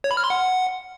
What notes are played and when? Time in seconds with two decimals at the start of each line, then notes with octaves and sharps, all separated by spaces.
0.04 C#5
0.11 B5
0.17 F6
0.24 C6
0.30 F#5